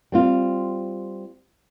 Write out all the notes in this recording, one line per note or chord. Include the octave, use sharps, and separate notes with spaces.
G3 C4 F4